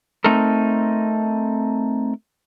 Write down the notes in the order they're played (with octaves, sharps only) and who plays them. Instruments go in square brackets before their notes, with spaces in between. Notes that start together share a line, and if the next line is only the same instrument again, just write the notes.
[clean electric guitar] A3 C4 D#4 A4 A#4